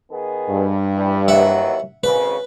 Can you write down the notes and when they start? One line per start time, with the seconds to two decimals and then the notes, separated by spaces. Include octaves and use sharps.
0.11 D#3 B3 G#4
0.50 G2
0.96 E3 G3
1.28 D#2 E3 F#3 E5 F#5 B5
2.04 G#1 C#3 B4